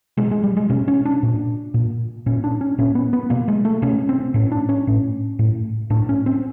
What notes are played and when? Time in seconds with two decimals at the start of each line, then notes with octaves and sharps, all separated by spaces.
0.18 B2 G#3
0.31 G#3
0.44 G3
0.57 G#3
0.70 B2 C#4
0.88 C#4
1.05 D4
1.23 A#2
1.74 A#2
2.26 A#2 C#4
2.44 D4
2.61 C#4
2.78 A#2 C#4
2.95 B3
3.13 B3
3.30 B2 A#3
3.48 G#3
3.65 A3
3.82 B2 C#4
4.09 C4
4.34 A2 C#4
4.52 D4
4.69 C#4
4.87 A2
5.39 A2
5.90 A2 D4
6.09 C#4
6.26 C4